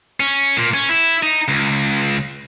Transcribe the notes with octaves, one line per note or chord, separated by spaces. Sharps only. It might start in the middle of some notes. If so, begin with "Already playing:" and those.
C#4
A#2
C#4
E4
D#4
C#2